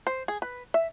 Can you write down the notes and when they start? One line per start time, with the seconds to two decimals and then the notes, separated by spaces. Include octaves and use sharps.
0.07 C5
0.28 G#4
0.42 B4
0.74 E5